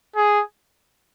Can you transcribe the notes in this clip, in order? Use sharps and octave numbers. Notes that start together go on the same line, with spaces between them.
G#4